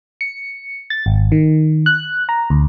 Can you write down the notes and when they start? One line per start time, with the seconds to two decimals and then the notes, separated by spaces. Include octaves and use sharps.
0.21 C#7
0.90 A6
1.06 G#1
1.32 D#3
1.86 F#6
2.29 A#5
2.50 D2